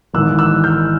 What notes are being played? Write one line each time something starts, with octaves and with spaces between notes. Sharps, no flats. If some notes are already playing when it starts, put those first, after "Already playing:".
G#1 G#2 E3 E6 F#6
E6 F#6
F6 G6